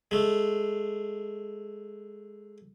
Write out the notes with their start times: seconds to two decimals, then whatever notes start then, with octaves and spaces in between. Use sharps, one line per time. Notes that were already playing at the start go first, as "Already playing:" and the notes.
0.11 G#3 A3